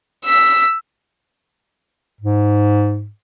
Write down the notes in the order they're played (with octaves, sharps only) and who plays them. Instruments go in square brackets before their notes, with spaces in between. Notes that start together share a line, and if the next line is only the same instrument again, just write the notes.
[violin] E6 B6
[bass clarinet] G#2